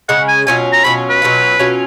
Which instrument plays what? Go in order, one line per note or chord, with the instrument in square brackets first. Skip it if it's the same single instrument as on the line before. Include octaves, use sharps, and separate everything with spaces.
[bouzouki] C#3 G#3 C#4 [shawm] F#5
[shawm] G#5
[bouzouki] B2 F#3 C#4 F4 [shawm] G#5
[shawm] A#5
[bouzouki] B2 F#3 C#4 F4 [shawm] B5
[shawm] B4
[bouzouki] B2 F#3 C#4 F4
B2 F#3 C#4 F4